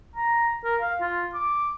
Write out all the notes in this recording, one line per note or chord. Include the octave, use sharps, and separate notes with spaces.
A#5
A#4
F5
F4
D6